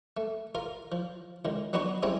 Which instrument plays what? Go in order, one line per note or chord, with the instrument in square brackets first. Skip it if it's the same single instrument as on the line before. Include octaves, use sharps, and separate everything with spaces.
[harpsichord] A3
F4 A#4 F5
F3
C#2 D#3
F#3 B3 D4 D#4 C6 C#6
G3 C4 C#4 E4 G#4